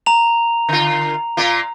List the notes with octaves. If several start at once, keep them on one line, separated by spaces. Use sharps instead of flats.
A#5 F7
D3 F4
A#2 A#3 F4